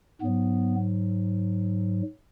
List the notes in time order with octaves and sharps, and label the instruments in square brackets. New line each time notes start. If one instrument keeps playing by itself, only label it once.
[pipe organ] G#2 F#3 B3